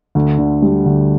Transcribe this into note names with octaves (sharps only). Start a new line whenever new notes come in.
D2
D3
G3
D2